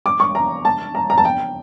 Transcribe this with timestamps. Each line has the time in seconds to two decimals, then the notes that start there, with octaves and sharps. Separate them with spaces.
0.06 D6
0.20 C#6
0.35 A#5
0.65 A5
0.95 A#5
1.10 A#5
1.18 A5
1.25 G5